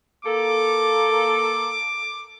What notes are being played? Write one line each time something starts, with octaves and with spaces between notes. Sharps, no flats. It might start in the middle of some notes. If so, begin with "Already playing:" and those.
A#3 A4 D6